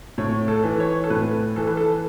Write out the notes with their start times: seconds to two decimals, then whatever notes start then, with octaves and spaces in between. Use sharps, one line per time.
0.18 A2 C#5
0.48 A4
0.64 E3
0.80 C#5
1.04 A4
1.10 A2 B4
1.56 E3 A4
1.67 B4
1.77 A4